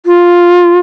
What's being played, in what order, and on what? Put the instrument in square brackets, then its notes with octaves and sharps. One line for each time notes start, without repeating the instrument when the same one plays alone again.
[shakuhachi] F4